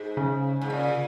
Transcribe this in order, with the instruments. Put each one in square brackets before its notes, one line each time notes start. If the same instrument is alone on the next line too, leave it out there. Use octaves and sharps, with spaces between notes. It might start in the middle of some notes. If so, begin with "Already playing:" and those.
Already playing: [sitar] G#2
[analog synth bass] C#3
[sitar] G#2
A#2